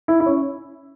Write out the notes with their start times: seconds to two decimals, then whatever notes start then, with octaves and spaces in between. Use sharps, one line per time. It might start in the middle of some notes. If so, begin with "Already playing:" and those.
0.08 E4
0.20 E4
0.26 C#4